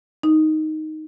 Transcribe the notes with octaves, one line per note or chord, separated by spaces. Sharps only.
D#4